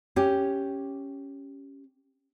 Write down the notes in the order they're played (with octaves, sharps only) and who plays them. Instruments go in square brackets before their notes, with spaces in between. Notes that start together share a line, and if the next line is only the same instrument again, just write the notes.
[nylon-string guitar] C#4 G4